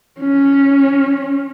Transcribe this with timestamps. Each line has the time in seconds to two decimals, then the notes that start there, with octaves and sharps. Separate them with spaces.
0.20 C#4